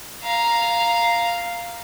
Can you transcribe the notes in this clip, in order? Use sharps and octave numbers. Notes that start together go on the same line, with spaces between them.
F5 A#5